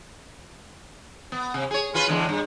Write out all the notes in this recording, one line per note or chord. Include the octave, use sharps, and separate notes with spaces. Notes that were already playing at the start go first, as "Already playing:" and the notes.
B3
C3
G#4 C#5
C#4 F4 B4
E2 D3 G#3
G2